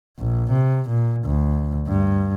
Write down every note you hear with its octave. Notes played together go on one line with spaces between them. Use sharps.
A#1
C3
A#2
D2
G2